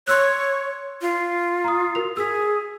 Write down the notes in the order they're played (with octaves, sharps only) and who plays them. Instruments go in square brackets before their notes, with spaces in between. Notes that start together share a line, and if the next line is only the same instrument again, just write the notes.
[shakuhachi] C#5 [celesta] C6 E6 F#6
[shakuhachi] F4
[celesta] A#5 D#6
F#4 A#4 F7
[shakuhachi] G#4 [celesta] E6 B6